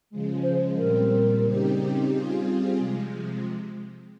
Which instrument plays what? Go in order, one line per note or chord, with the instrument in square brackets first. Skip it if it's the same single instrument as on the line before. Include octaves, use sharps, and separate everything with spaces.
[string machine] C#3 F3 G#3
[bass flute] C5
[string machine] A#2 G3 C4 [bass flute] A#4
[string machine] C#3 G3 C4 D#4 G4
G3 C4 F4 G#4
C3 F3 G#3